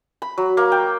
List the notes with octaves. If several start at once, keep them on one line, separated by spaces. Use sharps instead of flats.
B5
F#3
A#3
G5